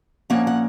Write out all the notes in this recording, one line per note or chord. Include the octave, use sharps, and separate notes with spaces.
A#2 F3 A#3 C#4 F#5
F#5